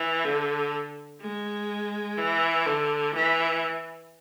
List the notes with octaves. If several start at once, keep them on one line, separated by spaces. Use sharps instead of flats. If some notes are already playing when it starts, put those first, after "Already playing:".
Already playing: E3
D3
G#3
E3
D3
E3